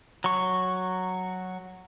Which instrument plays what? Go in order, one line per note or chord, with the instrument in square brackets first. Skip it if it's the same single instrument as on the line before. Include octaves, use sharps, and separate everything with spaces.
[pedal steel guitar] F#3 C#6